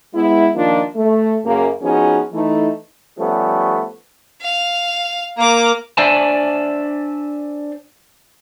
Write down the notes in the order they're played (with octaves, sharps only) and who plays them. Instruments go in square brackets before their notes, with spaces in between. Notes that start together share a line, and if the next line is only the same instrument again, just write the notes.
[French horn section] G#3 B3 E4
D#3 F3 A#3 D4 D#4 F4
A3
F#2 C#3 A#3
F3 B3 C#4 D#4 F#4 G#4
E3 A3 D#4
[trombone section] F3 G3 A3 B3 C#4
[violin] F5
[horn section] A#3 [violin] A#5 D6
[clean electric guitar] D4 C5 D5 E5 G#5 A5